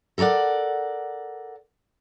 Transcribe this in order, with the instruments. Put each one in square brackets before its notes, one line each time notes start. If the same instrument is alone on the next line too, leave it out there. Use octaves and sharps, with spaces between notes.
[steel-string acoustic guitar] A4 A#4 C#5 D5 F#5